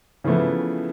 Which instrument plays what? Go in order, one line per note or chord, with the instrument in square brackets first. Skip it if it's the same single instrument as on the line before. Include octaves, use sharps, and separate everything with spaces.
[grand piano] C#3 E3 F3 A3 B3